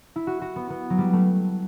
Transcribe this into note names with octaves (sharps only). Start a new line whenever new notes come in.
E4
F#4
F#4
B3
B3
F#3
G3
A3